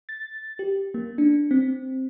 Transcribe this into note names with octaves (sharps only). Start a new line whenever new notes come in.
A6
G4
A#3
D4
C4